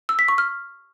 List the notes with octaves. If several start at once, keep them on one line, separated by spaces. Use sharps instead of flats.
E6
B6
C#6
F6